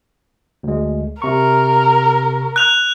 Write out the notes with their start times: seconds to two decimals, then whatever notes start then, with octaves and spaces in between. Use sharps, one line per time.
0.63 D2 G#3
1.22 C3 A#4 C#6
2.56 F#6 F7